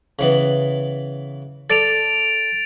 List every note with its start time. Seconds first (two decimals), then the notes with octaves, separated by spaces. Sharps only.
0.19 C#3 E3 B3
1.70 A4 D5 A5 A6 D7 F7